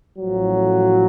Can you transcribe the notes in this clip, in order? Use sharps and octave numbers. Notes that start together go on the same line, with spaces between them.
A1 A2 F3 F#3